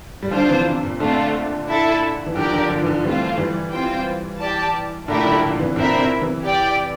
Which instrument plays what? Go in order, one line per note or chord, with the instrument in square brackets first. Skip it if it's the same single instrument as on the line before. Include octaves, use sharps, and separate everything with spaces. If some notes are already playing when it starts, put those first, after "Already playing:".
[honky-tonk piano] G3
[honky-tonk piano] D3 F3 [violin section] D4 F4 C5
[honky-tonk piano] C3 E3
C3
A#2
[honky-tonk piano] A#2 D3 [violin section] A3 C4 F4
[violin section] E4 A4 E5 A5
[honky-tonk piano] E3
[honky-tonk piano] D3 F3 [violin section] G4 A#4 D5
[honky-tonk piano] D3 F3
D3 F3
E3
D3 F3
[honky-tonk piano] E3 G3 [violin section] A3 C4 F4
[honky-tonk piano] E3 G3
[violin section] C4 F4 C5 G5
G4 D5 A5
[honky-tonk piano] A#2 D3 [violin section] A3 E4 G4 A#4 E5
[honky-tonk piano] D3 F3
A#2 D3
C3 E3
[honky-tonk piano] A#2 D3 [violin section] C4 E4 A#4 E5
[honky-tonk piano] C3
C3 E3
[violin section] G4 D5 G5